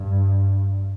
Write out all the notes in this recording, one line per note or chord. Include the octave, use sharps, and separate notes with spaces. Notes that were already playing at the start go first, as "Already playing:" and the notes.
Already playing: G2